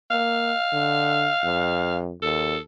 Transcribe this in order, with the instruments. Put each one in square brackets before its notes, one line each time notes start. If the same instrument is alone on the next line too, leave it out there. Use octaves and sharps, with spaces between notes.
[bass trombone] A#3 [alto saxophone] F5
[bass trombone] D3
F2
[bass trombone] D#2 [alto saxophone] A4